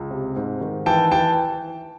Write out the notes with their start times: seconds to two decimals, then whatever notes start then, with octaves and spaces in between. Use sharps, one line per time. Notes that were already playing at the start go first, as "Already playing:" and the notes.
Already playing: C#2
0.11 C3
0.36 G#2
0.61 D#3
0.86 E3 G5 A5
1.11 E3 G5 A5